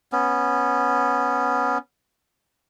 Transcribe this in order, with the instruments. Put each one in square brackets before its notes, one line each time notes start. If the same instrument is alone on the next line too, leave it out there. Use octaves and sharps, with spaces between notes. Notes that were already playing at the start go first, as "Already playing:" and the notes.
[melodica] B3 C#4